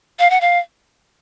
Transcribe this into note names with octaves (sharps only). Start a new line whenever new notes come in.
F5
F#5
F5